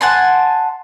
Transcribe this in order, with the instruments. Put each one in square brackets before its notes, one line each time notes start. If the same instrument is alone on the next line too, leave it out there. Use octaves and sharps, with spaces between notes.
[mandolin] F#5 G#5 A5 C6